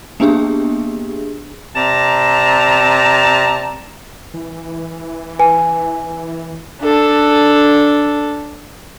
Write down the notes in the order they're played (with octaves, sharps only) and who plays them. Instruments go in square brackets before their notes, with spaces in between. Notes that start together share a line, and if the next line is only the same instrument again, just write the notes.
[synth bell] A#3 B3 D4 G4 G#4
[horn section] C3 D5 A5 A#5
[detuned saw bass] E3
[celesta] B4 G#5
[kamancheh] D4 A4